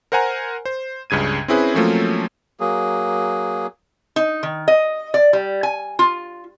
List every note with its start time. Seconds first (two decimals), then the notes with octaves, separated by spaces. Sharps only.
0.12 A#4 C5 F#5 G#5 A#5
0.65 C5
1.10 C#2 G2 C#3 G#6 D#7
1.48 C4 C#4 E4 G#4 B4
1.74 F3 F#3 A3 A#3 C4 C#4
2.60 F#3 A#3 G#4
4.16 D#4
4.43 D#3
4.68 D#5
5.14 D5
5.33 G3
5.63 G#5
5.99 F4